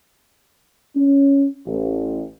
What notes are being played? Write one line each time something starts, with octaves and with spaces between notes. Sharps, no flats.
C#4
A1